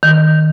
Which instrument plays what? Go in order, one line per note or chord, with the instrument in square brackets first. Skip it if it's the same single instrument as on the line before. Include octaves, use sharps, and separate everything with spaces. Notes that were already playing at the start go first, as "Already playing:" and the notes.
[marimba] D#3